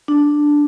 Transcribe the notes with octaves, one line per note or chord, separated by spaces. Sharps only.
D4